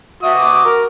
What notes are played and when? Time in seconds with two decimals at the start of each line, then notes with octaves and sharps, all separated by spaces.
0.23 F#4 E5 D#6
0.36 D6
0.65 A#4